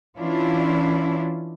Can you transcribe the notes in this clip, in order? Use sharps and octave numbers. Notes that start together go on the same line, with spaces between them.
E3 C#4 D4 E4 F4